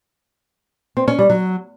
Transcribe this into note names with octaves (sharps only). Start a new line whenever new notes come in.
C4
C#4
G3
F#3